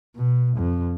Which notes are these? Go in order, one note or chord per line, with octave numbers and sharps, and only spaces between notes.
B2
F2